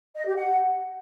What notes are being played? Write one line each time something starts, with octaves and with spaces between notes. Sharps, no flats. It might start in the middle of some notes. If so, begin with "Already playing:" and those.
D#5
G4
F#5